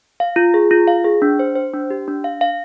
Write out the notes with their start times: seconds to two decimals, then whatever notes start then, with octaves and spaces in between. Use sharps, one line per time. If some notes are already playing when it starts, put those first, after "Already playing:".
0.20 F5
0.36 F4
0.54 G#4
0.71 F4
0.88 F5
1.04 G#4
1.22 D4
1.39 C5
1.55 C5
1.74 D4
1.90 G4
2.08 D4
2.24 F5
2.41 F5